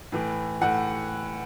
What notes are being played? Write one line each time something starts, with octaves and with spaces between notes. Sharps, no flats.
A2 E3
A2 E3 F#5